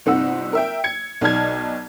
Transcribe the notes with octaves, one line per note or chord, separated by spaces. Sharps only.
G1 C3 C4 D#4 F#5 E6
A#4 E5 G5
G#6 C#7
B1 D#4 D5 A5 F6 G#6